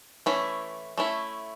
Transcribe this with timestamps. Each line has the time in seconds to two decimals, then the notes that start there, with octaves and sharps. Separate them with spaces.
0.26 E3 A3 C#4 E4
0.98 A3 C#4 E4